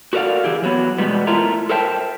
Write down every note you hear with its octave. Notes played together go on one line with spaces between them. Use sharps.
F#4 A4 A#4 D5 F5 F#5
E3 E4 G4 G#4
E3 F#3 B3
E2 B2 G3 G#3 B3
A3 E4 F4 A#4
A4 A#4 C5 E5 G5 A5